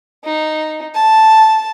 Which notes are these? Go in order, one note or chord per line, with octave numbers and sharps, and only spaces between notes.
D#4
A5